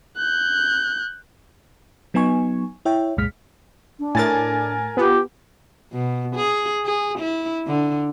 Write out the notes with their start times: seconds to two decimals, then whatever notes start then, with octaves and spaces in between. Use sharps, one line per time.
0.17 F#6 G6
2.14 F#3 B3 D#4 G#5 C#6
2.85 E4 C#5 E5 G5
3.17 C2 F#2 A#2 G#3 F6 B6
3.99 D4
4.15 A2 A#4 G#5 A6
4.97 B3 F4 G4
5.93 B2
6.36 G#4
6.85 G#4
7.18 E4
7.67 D3